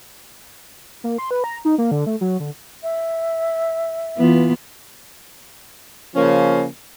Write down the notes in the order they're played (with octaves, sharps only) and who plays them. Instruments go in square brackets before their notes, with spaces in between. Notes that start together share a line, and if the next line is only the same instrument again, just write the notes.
[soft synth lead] A#3
C6
B4
A#5
D#4
A#3
D3
A3
F#3
D3
[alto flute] E5
[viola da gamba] E3 B3 F4
[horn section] C#3 F3 A#3 C#4